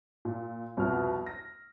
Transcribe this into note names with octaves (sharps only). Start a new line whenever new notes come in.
A#2
C2 F2 B2 F#4 B4 F6
A#6